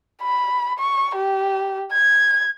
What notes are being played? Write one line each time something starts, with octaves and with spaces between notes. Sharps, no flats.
B5
C#6
G4
G#6